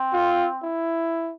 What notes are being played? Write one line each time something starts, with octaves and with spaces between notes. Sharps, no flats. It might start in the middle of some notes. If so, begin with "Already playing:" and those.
Already playing: C4
F4
E4